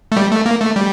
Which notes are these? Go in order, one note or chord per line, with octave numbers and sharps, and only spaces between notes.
A3
G3
A3
A#3
A3
G3